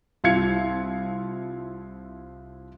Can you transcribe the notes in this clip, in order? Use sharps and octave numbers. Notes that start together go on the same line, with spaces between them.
C2 E4 F4 F5 G#6 C#7